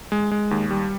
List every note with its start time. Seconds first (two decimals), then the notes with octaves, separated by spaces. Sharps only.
0.12 G#3
0.31 G#3
0.51 D#2
0.71 G3